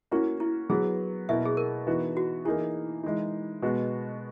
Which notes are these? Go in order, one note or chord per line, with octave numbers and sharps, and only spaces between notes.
A#3 C#4 E4 F#4
E4
F#3 B3 F#4 G#4 B4
B2 A#3 E4 A#4 E5
G#4
A#4
E3 B3 D#4 F#4
F#4
E3 A#3 D#4 E4 G#4
E3 G#3 D#4
B2 G#3 B3 F#4